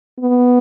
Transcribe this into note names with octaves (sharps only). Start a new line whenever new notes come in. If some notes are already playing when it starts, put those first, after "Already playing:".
B3